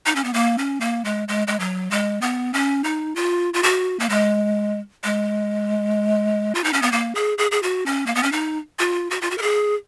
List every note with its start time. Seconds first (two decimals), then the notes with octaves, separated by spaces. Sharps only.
0.06 D#4
0.16 C#4
0.24 B3
0.34 A#3
0.58 C#4
0.80 A#3
1.05 G#3
1.28 G#3
1.47 G#3
1.60 F#3
1.91 G#3
2.21 B3
2.54 C#4
2.84 D#4
3.16 F4
3.54 F4
3.63 F#4
4.00 A#3
4.09 G#3
5.04 G#3
6.55 F4
6.64 D#4
6.73 C#4
6.82 B3
6.92 A#3
7.15 G#4
7.38 G#4
7.51 G#4
7.63 F#4
7.86 C#4
8.06 A#3
8.15 B3
8.23 C#4
8.32 D#4
8.79 F4
9.10 F#4
9.21 F4
9.31 F#4
9.38 A#4
9.42 G#4